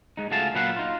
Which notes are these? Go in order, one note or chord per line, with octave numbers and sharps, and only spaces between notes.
G#3 D#4
C#2 A3 F#4 G#4 F5 A5
A#2 F#3 B4 F5 F#5
D#4 F4